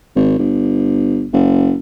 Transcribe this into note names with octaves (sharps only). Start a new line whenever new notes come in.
G#1
G1
F#1